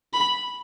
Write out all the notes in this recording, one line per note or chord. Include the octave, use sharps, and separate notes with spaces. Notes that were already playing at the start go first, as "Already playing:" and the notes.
B5